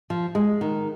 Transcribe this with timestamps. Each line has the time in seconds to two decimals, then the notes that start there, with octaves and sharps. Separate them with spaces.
0.10 F3
0.35 G#3
0.61 D#3